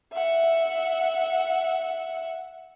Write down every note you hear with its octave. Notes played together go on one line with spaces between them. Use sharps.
E5 F#5